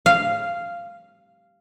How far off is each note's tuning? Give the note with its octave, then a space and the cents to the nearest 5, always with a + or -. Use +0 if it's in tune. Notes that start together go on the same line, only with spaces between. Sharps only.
F5 -10